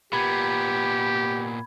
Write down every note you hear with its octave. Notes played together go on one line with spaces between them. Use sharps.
A#2 B3 G4 B5 G#6